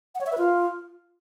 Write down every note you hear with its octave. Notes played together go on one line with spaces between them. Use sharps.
F#5
C#5
E5
B4
F4